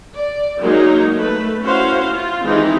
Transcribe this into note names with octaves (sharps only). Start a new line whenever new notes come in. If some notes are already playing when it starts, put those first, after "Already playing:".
D5
F#3 G#3 A#3 D#4
A3 B4
C#4 E4 F#4 C5 F5
F4
D#3 E3 G#3 C4 D#4 G4